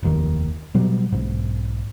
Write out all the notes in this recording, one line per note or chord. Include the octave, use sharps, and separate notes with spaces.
F1 D#2 D#3
B2 F#3 G3
B1 G#2